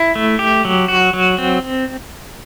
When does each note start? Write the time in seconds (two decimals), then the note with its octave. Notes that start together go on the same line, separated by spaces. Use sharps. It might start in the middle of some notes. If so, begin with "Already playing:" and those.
Already playing: E4
0.15 A3
0.39 G4
0.65 F#3
0.88 F#4
1.13 F#3
1.38 C4